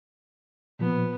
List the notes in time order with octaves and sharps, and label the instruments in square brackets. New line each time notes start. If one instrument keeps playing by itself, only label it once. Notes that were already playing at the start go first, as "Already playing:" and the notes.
[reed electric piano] A#2 F3 [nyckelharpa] B3